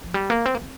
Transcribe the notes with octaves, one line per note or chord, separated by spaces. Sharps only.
F3
G3
A#3
C4
A#3
C4